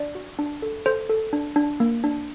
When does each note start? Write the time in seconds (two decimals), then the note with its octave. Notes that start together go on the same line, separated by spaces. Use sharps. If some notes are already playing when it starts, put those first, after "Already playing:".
Already playing: D4 D5
0.15 F#4
0.39 D4
0.62 A4
0.86 A4 C5
1.10 A4
1.33 D4
1.56 D4
1.80 A#3
2.04 D4